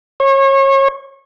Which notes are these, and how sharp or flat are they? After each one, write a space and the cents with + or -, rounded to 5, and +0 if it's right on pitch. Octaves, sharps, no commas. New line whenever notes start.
C#5 -30